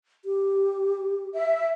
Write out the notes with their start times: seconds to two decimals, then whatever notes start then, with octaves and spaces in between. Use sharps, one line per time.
0.25 G4
1.34 E5